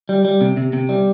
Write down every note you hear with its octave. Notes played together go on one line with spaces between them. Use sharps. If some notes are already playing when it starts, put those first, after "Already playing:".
G3
G3
C3
C3
C3
G3